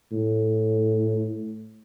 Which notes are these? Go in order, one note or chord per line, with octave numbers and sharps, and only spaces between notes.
A2